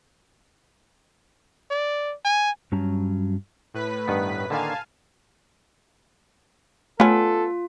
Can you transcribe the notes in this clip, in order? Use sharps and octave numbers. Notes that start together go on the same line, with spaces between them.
D5
G#5
G2 F#3 G3 C#4 A5 A#5
A2 B4 B6
G2 D#3 B3
D3 D#3 A#3 F5 G#5 A5
A3 B3 C#4 F4 A4